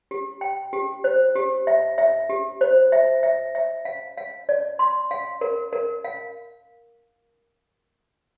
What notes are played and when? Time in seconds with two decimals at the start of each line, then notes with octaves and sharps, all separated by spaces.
0.11 G4
0.41 G5
0.73 G4
1.04 C5
1.36 G4
1.67 E5
1.98 E5
2.29 G4
2.61 C5
2.92 E5
3.23 E5
3.55 E5
3.85 F5
4.17 F5
4.49 D5
4.79 C6
5.11 F5
5.41 A#4
5.73 A#4
6.04 F5